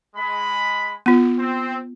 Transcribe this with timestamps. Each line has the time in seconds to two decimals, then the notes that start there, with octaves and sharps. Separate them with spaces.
0.15 G#3 B5
1.06 B3 F4
1.38 C4